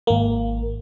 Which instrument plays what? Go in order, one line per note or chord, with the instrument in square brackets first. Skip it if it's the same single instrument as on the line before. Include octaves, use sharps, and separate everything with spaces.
[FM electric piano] G#1 A#3